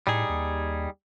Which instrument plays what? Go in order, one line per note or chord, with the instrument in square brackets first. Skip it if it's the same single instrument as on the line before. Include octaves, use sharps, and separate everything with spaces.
[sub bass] A2 [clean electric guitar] G3 D#4 G#4
[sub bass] D#2